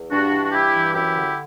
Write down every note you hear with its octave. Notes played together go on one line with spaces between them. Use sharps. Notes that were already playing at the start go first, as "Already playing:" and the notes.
Already playing: E2
G2 D4 F#4
E3
F#4
G2 E4 G4
E3
F#2 E4 G4
D3